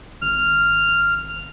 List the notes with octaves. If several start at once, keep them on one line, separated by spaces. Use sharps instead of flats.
G#1 F6